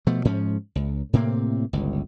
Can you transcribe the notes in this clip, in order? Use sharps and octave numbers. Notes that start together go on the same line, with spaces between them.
B2 F3 A3
G#2 F3 C#4
C#2
A2 C3 A#3 C4
G1 C#2